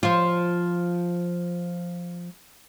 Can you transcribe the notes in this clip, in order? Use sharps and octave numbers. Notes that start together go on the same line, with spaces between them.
F3 F4